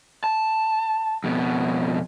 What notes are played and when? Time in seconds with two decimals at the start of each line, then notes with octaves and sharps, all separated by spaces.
0.24 A5
1.24 F2 B2